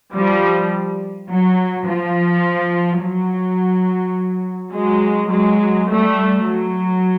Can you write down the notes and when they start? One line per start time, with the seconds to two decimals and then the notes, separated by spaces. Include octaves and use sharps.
0.14 F3 G3
1.29 F#3
1.87 F3
3.01 F#3
4.73 F#3 G#3
5.31 F#3 G#3
5.89 G3 A3
6.46 F#3